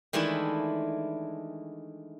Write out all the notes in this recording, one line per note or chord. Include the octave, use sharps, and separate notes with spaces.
D#3 E3 G#3 A3 D4 E4